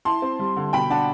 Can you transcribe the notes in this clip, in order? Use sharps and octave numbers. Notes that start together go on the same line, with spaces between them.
E4 A5 C6
C4
G3
D3
B2 G5 B5
D4 F#5 A5